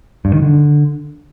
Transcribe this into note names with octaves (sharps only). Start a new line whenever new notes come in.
G2
D#3
D3